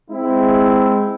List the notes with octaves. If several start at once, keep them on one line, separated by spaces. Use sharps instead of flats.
G#3 C4 E4